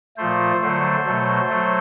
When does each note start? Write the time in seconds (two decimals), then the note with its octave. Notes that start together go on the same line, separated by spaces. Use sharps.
0.17 A#2 F3 A3 C5
0.61 D3 F#3 A3 C5
1.04 B2 F#3 A3
1.48 F#3 A3